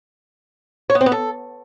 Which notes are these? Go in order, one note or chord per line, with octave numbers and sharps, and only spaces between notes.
C#5
B3
C4
B3
A4